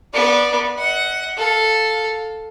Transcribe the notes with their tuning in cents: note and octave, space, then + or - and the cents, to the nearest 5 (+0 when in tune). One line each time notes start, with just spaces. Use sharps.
B3 -20 D5 +0
D#5 +45 F#5 +5
A4 +0 F5 +20